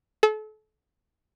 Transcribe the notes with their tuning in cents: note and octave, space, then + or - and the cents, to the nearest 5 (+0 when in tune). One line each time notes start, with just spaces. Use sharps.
A4 -35